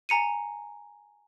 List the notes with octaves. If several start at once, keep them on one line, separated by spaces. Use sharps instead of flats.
G#5 A#5 C#7 D#7